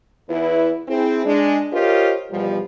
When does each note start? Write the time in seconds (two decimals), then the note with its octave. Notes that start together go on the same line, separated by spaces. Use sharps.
0.29 E2 E4 B4
0.88 C4 E4 G#4
1.25 G#3 D4
1.72 F4 G4 A#4 C5 C#5 D#5
2.31 E2 B2 F3 G3